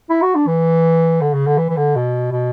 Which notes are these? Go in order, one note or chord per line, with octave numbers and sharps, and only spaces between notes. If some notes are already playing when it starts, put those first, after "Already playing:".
E4
F#4
D4
E3
D3
C#3
D3
E3
E3
D3
B2
B2